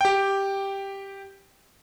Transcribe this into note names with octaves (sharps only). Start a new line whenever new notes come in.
G4 G5